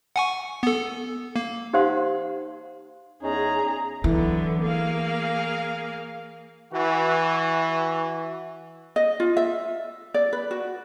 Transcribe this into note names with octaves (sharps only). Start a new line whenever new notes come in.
F#5 G#5 C#6
B3 A4
A#3
D#4 G4 C5 F5 F#5 C6
E2 C#4 D#4 G#4 A#5
D3 E3 F#3 B3
A#3 G#4 F5
E3 F#4
D#5
F4
E5
D5
B4
F#4